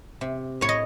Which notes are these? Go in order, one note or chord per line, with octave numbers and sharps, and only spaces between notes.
C3
A2 C#5
D#5